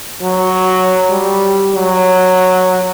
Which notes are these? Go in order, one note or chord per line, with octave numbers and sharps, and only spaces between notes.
F#3
G3
F#3